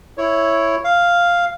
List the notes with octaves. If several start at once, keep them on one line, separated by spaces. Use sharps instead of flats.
E4 C#5
F5